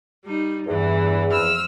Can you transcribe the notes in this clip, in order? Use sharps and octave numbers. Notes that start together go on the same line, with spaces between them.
G3 D#4
E2 G2 E3
F2 E6 F6